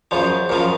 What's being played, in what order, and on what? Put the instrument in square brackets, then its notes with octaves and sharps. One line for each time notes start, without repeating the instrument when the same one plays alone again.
[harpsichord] F#2 C#3 F3 [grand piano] C5
[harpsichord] F#2 C#3 F3 [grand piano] A#4